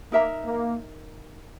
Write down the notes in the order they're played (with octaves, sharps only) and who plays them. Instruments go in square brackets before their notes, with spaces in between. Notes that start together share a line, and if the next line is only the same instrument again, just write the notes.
[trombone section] A#3 [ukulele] D#4 A#4 E5 A#5
[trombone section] A#3